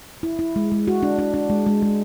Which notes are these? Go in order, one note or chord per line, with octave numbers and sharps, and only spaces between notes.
E4
E4
G#3
G#3
F#4
D4
D4
D4
G#3
G#3
G#3